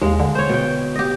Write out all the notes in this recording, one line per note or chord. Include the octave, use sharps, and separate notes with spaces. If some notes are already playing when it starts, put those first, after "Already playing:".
D#2 G#3 F5
D3
C5 C#5
B2 G5
G4 D#5